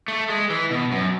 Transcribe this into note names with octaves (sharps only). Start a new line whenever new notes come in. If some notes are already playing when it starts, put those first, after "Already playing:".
A3
G#3
E3
B2
F#2